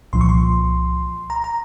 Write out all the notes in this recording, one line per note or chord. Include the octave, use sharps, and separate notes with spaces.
C2 A#2 F3 C6
C#6
C6
A#5
A#5